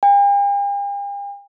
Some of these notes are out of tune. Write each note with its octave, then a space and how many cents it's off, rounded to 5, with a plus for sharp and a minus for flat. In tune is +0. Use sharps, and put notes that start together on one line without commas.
G5 +45